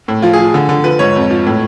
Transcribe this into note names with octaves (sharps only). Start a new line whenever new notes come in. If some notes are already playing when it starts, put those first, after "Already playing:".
A2
F3 F4
G#4
F3
D3
D3
F3 B4
G#2 C#5
F2
F3
A2